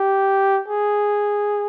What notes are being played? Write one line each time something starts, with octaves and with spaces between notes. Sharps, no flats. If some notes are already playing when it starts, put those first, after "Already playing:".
Already playing: G4
G#4